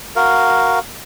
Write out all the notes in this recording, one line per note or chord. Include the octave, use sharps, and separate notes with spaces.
F#4 A#4 F5